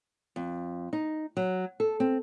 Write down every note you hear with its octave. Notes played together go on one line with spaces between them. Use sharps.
F2
D#4
F#3
A4
C4